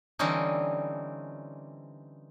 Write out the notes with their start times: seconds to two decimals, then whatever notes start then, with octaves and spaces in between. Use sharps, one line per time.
0.19 D3 E3 G3 C4 C#4 D#4